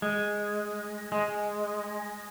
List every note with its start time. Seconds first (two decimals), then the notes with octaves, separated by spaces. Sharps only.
0.02 G#3
1.12 G#3